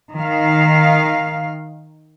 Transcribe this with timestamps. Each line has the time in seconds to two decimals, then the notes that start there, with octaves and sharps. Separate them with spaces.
0.13 D#3 F5